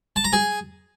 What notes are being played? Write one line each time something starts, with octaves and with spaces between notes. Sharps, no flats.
A5
A#5
G#4